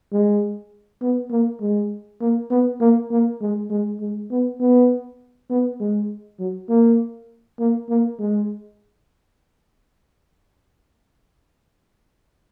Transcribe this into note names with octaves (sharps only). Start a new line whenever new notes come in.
G#3
B3
A#3
G#3
A#3
B3
A#3
A#3
G#3
G#3
G#3
B3
B3
B3
G#3
F#3
A#3
A#3
A#3
G#3